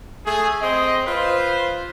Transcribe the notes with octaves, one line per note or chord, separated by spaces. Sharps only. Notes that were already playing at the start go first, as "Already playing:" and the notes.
A3 G#4
C4 C5 D#5
F4 B4 C5